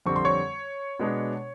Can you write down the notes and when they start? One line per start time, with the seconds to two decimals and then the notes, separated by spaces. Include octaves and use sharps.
0.06 F2 D3 G3 C4 C#6
0.16 C6
0.25 C#5 C#6
0.99 B2 G#3 B3 D4